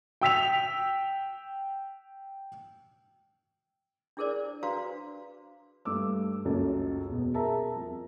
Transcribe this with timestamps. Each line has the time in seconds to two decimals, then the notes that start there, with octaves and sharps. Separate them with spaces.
0.21 G5 E6 B6 F7
4.17 D4 E4 G#4 A#4 C5 D5
4.63 D4 F#4 B4 C5 F5 A#5
5.85 G2 A3 D6 E6
6.45 F#1 C#2 F#2 C#4 A4
7.08 E1 B2
7.34 G#4 A#4 E5 A5 A#5
7.76 F2